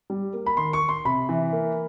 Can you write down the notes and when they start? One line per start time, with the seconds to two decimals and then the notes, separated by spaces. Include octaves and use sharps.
0.10 G3
0.33 A#3
0.46 B5
0.57 D#3 C6
0.73 C#6
0.82 D#3
0.89 C6
1.05 C3 B5
1.29 E3
1.52 A#3